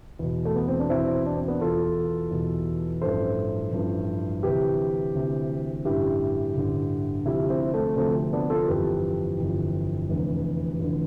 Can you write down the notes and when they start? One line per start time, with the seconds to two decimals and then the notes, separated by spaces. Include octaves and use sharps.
0.19 E2 B2
0.45 A3
0.56 B3
0.68 C4
0.79 D4
0.90 E2 B2 C4 E4
1.26 D4
1.37 C4
1.48 B3 D4
1.60 E2 B2 F4 A4
2.31 E2 B2
3.02 A1 G2 F3 A4 C5
3.73 A1 G2 F3
4.43 D2 C3 E3 G4 B4
5.14 D2 C3 E3
5.85 A1 G2 D3 E4 G4
6.55 A1 G2 D3
7.26 D2 C3 F3 E4 G4
7.49 C4 E4
7.74 A3 C4
7.96 D2 C3 F3 A3 C4
8.33 B3 D4
8.50 F4 A4
8.67 G1 F2 E3 G4 B4
9.38 G1 F2 E3
10.08 F1 E2 D3
10.79 F1 E2 D3